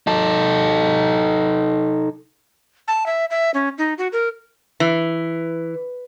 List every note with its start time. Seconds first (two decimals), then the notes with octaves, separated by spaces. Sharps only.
0.07 D#4 A4
2.88 A5
3.06 E5
3.30 E5
3.54 C#4
3.78 D#4
3.98 F#4
4.13 A#4
4.80 E3